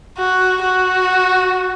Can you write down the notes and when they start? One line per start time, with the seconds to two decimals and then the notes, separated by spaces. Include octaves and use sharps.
0.18 F#4
0.63 F#4